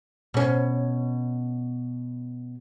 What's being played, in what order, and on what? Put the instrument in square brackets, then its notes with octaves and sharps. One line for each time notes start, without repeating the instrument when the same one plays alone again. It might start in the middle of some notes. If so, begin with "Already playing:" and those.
[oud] B2 C#4